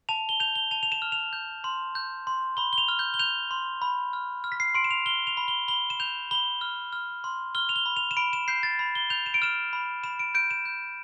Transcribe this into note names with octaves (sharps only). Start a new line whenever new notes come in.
A5 F7
G7
G6 F7
G7
A5 F7
F7
E7
F6
F7
G6
C6
G6
C6
B5 G7
G7
F7
F6
G6
G7
G6 F7
C6
B5
F6
F6
B6
C7
C6 D7
E7
F7
F6 G7
F7
B5
G7
B5 G7
E7
G6 F7
B5 G7
F6
F6
C6
F6 G7
F7
G7
B5
F7
E7
B5 D7
E7
G6 C7
A6
B5
G7
G6 F7
E7
D7
F6 E7
B5
B5 E7
D7
G6 D7
E7
G6